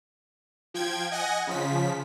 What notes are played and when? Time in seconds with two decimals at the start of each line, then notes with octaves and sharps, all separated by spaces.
0.74 F3 G5 G#6
1.12 D#5 F#5 G#5 A#6
1.47 C#3 F3 B6